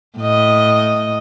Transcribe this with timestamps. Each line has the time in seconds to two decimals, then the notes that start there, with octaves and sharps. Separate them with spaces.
0.18 A2 D#5